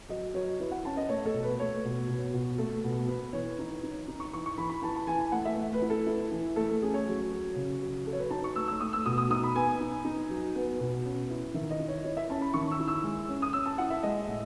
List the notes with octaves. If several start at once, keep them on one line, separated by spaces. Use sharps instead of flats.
F#3 D#5
F#3 C#5
E4 B4
F#5
C#4 A5
D#5
A3 C#5
A4
B2
B4
A3 C#5
B2
B2
B2
A3 A4
B2
B3 B4
E3 C#5
D#4
D#4
D#4
C#6
E3 C#6
C#6
E3 B5
B5
E3 A5
A5
E3 G#5
G#5
A3 F#5
E5
A3
B4
E4
A4
E4
E3
A3 A4
A4
C#4 G#4
C#5
F#3
F#3
C#3
F#3
F#3 A4
C#5
B4
D#4 A5
C#6
A3 E6
E6
A3 D#6
E6
B2 D#6
D#6
D#4 D#6
B5
B3 G#5
D#4
D#4
F#3
B3
B2
C#4
E4
D#3 E5
D#5
E4
C#5
E4 C#5
E5
C#4 A5
B5
D#3 C#6
E6
E4
E6
G#3
C#4
D#6
C#4 E6
A5
E4 F#5
E5
G#3 D#5
A2